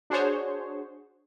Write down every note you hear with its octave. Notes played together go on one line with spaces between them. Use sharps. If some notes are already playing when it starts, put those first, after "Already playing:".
D4 F#4 G#4 C5 C#5